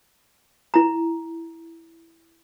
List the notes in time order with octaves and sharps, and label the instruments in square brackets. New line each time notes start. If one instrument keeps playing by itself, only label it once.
[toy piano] E4 A#5